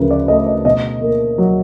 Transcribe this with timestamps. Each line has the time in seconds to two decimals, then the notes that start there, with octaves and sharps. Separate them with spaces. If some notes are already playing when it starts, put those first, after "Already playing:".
Already playing: D2 C#3 F3 A#4 B4
0.11 D5
0.28 A3 D#5
0.46 D#5
0.65 B2 D#5
1.02 A#3
1.38 F#3